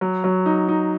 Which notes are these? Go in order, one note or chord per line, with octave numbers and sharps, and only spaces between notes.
F#3
F#3
D#4
D#4